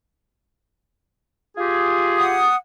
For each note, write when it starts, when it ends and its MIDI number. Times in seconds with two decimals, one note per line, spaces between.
1.57 2.46 65
1.57 2.46 67
1.57 2.46 68
2.18 2.55 78
2.18 2.55 87